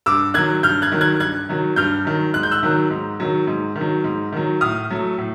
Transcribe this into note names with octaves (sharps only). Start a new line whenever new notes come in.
G2 D6 E6
D#3 F#3 F#6 G#6
G2 F6 G6
F#6 G#6
D#3 F#3
F#6 G#6
G2 F#6 G#6
D#3 F#3
G2 F6 G6
D#3 F#3
G#2 F#6
G6
E6 F#6
D#3 F#3
G#2
D#3 F#3
G#2
D#3
F#3
G#2
D#3 F#3
A2 D#6 F6
F#3 A3
A2